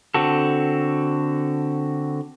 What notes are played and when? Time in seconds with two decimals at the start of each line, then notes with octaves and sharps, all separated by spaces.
0.14 D3 C4 F#4 A4